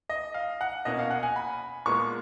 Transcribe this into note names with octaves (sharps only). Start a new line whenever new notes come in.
D#5
F5
F#5
B2 A#3 C#4 D#5
F5
F#5
G#5
B5
A#2 G#3 B3 C#6